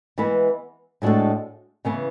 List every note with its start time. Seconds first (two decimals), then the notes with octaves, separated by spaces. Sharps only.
0.18 E3 G#3 B3 E4 B4
1.02 A2 G#3 D4 F#4 A4
1.85 C#3 E3 B3